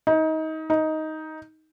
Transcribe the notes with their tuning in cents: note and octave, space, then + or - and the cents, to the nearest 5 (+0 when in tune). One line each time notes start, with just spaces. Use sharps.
D#4 +25
D#4 +10